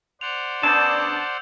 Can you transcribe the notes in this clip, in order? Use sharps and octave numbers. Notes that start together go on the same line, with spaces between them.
C5 D5 F#5 F7
C#3 B3 D4 A5 E6 G6